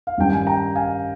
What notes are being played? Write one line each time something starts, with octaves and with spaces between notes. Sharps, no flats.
F5
G2 D#3 G3 C#4 G5
G#5
G5 A#5
F5 G#5